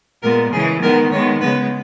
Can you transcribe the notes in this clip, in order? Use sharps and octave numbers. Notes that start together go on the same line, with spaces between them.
A#2 G#3 B3 A#4
C#3 E3 G#3 G#4
D#3 G#3 B3 A#4
D#3 G#3 B3 C#5
C#3 G#3 B3 B4